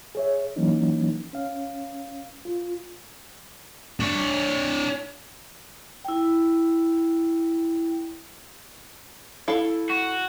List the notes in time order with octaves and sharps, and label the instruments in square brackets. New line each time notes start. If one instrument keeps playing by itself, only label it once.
[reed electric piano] G#4 C#5 E5
E3 F#3 A#3 C#4 D#4
C#4 F5
F4
[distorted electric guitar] D4 C#5
[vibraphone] E4 G5
[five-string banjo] E4 A4 F5
[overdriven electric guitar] F#4